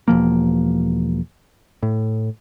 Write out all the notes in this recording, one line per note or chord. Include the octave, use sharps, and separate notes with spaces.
E1 F3 A#3
A2